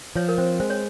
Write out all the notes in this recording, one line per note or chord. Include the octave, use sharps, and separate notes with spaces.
F3 C#5
A#4
C4 C5
G#3 C5
C#5